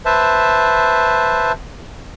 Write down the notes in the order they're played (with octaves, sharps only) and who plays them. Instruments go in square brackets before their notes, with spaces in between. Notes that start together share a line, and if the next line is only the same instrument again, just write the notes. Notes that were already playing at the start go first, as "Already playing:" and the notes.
[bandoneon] B4 C5 E5 A5